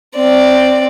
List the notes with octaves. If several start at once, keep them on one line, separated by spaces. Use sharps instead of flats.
C4 D5